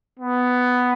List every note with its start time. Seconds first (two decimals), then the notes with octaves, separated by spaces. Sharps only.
0.19 B3